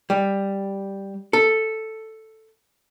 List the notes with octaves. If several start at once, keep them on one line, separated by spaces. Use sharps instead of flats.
G3
A4